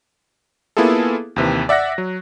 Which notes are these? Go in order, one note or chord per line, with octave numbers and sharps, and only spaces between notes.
A#3 B3 E4 F4 G#4 A4
D#2 C3 E3
D5 E5 F#5 F#6 A#6
F#3